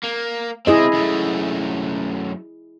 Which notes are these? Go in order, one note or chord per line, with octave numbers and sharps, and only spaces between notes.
A#3
C4 E4 G#4 D#5 E5
F#2 A3